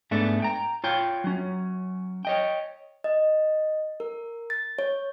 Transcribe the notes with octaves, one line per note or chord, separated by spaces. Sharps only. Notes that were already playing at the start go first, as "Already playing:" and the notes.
G#2 A3 B3 D4
G5 A#5
F4 C#5 G5
F#3 C#4
C#5 D#5 G5
D#5
A#4
A6
C#5